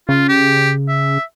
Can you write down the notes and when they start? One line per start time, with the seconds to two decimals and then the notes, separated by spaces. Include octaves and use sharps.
0.09 C#3 F4
0.29 G4
0.89 E5